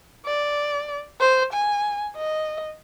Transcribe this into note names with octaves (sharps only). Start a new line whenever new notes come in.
D5
C5
G#5
D#5